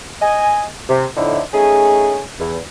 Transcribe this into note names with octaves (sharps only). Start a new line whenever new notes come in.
D#5 G#5
C3
F2 A2 D3 D#4 E4
A3 C#4 D#4 G#4
E2